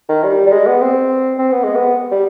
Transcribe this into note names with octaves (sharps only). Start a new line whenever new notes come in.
D#3
G3
G3
G#3
B3
C4
C4
B3
G#3
B3
G3